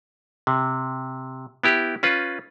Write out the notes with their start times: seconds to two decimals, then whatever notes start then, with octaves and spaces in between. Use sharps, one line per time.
0.47 C3
1.64 B3 E4 G4
2.03 C#4 F4 B4